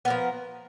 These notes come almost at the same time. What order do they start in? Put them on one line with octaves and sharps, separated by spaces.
B3 A#4 F3